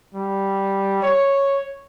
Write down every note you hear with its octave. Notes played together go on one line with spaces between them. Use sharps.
G3
C#5